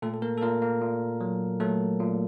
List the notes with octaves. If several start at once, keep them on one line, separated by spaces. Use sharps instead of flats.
A#2 A3 A4
A4
A#3 A#4
A4
A#2 A#3 A#4
A#3 A#4
A#2
F#3
F#3 A3 A4
A#2